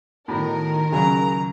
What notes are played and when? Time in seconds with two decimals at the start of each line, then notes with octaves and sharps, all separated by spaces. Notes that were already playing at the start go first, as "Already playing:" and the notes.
0.28 A2 D#3 B3 F#4 A#4 A5 B5
0.92 C#2 C#3 F#3 G#4 G#5 A#5